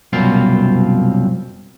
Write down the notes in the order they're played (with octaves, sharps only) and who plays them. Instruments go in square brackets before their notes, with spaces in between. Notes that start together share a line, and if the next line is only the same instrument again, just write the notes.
[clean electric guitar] C2 F#2 B2 C4 F4 F5